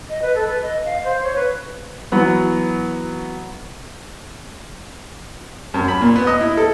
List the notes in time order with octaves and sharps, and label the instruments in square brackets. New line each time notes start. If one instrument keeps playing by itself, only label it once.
[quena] D#5
B4
A4
B4
D#5
F5
C5
C#5
B4
[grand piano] E3 F#3 B3
[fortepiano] F#2
B5
A#2
B3
D#5
E4
A4